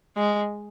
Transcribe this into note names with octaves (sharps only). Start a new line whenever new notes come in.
G#3